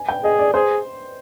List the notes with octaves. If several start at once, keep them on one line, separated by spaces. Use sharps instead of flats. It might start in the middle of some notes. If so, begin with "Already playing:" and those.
Already playing: G#5
G5
G#4 D#5
D5
G#4 C5